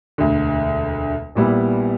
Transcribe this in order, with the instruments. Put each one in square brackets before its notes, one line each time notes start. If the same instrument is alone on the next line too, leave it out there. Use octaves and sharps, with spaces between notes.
[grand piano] E1 D2 D3
A#1 A#2 G3 B3 E4